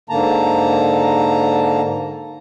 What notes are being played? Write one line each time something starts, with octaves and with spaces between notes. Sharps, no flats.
G#2 D3 A#3 A5 A#5